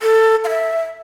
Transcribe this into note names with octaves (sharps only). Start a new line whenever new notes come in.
A4
F5
E5